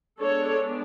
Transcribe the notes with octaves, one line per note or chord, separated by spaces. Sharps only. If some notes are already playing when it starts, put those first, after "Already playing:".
G#3 B3 D4 A4 C#5